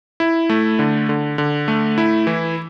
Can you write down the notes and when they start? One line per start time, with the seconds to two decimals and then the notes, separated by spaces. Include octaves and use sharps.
0.20 E4
0.49 A3
0.79 D3
1.09 D3
1.38 D3
1.68 A3
1.98 E4
2.27 E3